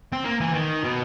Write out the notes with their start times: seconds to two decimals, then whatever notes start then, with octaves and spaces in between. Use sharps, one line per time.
0.12 C4
0.25 A#3
0.41 E3
0.54 D#3
0.84 B2